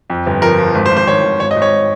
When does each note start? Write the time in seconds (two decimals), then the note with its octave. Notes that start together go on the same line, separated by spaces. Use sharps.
0.10 F2
0.26 G1
0.42 F3 A#4
0.59 F3
0.75 G#1
0.86 C5
0.91 G#1
0.97 C5
1.07 D#3 C#5
1.24 G#1
1.40 G#1 C#5
1.51 D#5
1.56 G#1
1.62 C#5